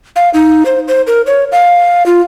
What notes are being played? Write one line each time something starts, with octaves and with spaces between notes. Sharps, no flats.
F5
D#4
C5
C5
A#4
C#5
F5
F4